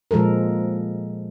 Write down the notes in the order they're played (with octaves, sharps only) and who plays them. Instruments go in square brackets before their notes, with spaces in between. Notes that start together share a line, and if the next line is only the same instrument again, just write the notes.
[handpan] A#2 F3 G#3 A4 A#4